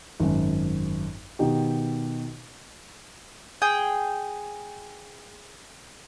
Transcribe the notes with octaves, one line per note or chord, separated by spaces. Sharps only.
G#1 F#2
B2 D#3 D#4 G4
G#4 G5